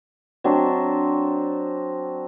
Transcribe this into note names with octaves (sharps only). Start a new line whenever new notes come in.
F#3 C4 D4